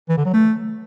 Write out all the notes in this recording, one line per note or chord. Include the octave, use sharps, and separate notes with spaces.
E3
D3
F#3
A3